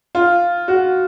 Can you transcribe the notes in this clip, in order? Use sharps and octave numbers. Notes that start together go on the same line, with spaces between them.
F4
F#4